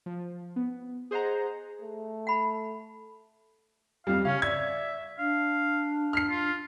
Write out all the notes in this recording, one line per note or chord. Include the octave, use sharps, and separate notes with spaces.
F3
B3
G#4 C5 D#5 F#5 A#5
A3
F#5 B5
F2 G3 F5
C#3 C#4 F5
D5 E5 G#6
D4 F5
F6 B6 C7
F4